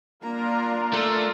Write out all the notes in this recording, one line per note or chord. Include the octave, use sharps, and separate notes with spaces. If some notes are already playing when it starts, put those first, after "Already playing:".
A#3 D4 F4 A#4 A#5
A3